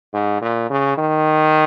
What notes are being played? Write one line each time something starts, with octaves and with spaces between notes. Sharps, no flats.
G#2
A#2
C#3
D#3